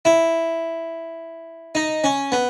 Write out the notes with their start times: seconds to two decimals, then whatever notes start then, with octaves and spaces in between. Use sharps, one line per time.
0.05 E4
1.75 D#4
2.04 C#4
2.32 B3